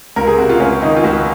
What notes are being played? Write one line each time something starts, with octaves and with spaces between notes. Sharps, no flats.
C#2 A#4
G#4
C3 F#4
F4
C#2 C#4
D#3 D#4
F4
C#2 F#4